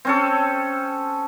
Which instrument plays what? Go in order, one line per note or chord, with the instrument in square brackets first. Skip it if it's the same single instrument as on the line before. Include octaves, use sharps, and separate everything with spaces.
[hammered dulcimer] C4 C#4 A4